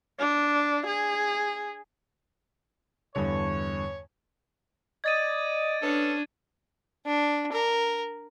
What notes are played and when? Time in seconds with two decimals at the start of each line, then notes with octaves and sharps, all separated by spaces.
0.19 D4
0.87 G#4
3.16 E2 G2 D3 C#5
5.04 D5 D#5 G#6 A6 D#7
5.82 B3 C#4 D4 A4
7.06 D4
7.52 A#4